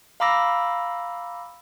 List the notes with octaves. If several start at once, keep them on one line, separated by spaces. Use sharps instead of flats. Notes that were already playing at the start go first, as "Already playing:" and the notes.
F5 A#5 B5 D6 E6 A#6